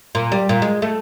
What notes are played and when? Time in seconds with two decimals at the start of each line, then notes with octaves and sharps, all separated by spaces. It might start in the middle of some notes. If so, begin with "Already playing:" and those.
0.15 A#2
0.32 G3
0.49 A#2
0.62 G#3
0.82 A3